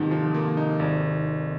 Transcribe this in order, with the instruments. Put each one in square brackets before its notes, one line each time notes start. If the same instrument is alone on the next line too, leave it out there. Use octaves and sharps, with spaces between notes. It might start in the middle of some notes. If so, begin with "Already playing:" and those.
Already playing: [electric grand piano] G#2 F3 A#3 D#4 [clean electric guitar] C3 D#3
[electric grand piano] F3
A#3
D#4
G#1